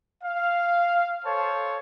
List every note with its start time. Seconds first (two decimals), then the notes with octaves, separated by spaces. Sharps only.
0.22 F5
1.23 A4 C5 C#5 F5 A5